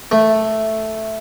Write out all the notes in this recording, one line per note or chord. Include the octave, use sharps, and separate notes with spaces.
A3